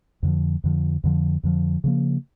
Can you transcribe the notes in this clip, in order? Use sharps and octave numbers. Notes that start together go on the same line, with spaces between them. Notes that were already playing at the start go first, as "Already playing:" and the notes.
F2 D3 F3
F2 D3 F3
F2 D3 F3
F2 D3 F3
C#3 F3 A#3